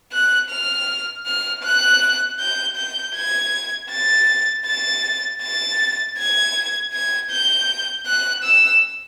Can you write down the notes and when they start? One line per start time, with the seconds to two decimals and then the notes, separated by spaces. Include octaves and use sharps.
0.12 F#6
0.50 F6
1.26 F6
1.63 F#6
2.39 G6
2.76 G6
3.15 G#6
3.90 A6
4.66 A6
5.41 A6
6.18 G#6
6.93 G#6
7.30 G6
8.06 F#6
8.44 E6